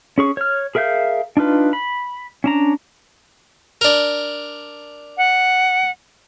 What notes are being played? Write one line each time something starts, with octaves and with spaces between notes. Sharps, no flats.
C#4 G#4 C#6
C#5 F6
G#4 A#4 E5 F5 G6
D4 D#4 F4 B4
B5
C#4 D4 A#5
D4 A#4
F#5